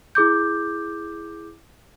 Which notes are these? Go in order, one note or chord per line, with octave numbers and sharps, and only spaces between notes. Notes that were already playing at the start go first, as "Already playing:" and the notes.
E4 G#4 D6 G6